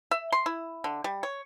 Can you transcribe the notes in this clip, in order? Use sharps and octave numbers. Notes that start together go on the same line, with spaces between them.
E5
C6
E4
D3
G3
C#5